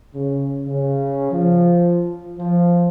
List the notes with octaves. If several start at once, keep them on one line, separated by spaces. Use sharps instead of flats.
C#3
C#3
F3
F3